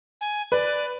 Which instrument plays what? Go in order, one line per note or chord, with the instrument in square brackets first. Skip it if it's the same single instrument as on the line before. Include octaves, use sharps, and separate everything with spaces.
[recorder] G#5
[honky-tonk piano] B4 [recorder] D5